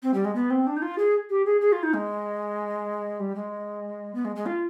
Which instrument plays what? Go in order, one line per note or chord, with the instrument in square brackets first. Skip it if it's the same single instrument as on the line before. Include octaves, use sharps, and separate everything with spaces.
[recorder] C4
G3
G#3
B3
C4
D4
D#4
F4
G#4
G4
G#4
G#4
F4
D#4
G#3
G3
G#3
B3
G#3
G#3
F4